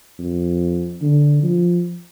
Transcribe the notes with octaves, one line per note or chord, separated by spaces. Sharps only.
F2
D3
F3